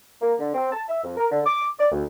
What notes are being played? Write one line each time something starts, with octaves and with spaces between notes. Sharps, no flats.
A#3
D3
C4
A5
E5
F2
A#4
D3
D6
D5
D2